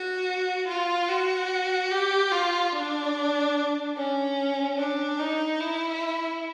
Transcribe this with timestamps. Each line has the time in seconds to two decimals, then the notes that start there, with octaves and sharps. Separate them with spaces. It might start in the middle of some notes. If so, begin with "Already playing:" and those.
Already playing: F#4
0.68 F4
1.09 F#4
1.91 G4
2.32 F4
2.73 D4
3.96 C#4
4.78 D4
5.19 D#4
5.60 E4